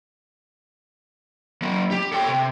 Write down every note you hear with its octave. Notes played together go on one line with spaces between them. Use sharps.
F#3 A#3
G4
A4 G5
C3